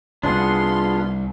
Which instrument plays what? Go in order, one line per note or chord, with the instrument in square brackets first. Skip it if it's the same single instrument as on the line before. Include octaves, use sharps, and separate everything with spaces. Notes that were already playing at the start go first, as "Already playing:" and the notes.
[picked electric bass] C2 [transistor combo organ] B3 F4 [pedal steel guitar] D4 G#4 F#5 [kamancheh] C6